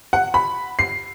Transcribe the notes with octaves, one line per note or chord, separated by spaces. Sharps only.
F#5
B5
C7